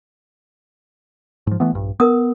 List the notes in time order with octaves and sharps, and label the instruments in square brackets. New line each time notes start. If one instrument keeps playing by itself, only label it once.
[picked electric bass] G#2 F3
E3 A3 B3
A#1 G2
[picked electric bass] B3 [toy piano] A#4 D#6